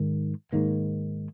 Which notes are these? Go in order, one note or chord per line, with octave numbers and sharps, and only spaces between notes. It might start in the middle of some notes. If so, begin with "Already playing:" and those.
Already playing: G#2 D#3
G#2 D#3 A#3